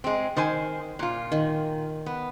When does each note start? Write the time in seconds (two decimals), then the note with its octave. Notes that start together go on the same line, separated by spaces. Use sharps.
0.04 G#3 C4
0.37 D#3 C5 G#5
0.99 A#2 F4
1.32 D#3
2.06 B3